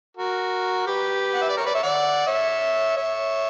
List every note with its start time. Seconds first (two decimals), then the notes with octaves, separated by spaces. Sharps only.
0.17 F#4 A#4
0.87 G4 B4
1.34 F#5
1.42 E5
1.50 D5
1.57 A#4 C#5
1.65 B4 D5
1.74 C#5 E5
1.83 D5 F#5
2.27 C#5 E5
2.97 C#5 E5